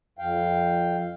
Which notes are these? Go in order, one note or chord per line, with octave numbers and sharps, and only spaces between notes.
F2 F5 G5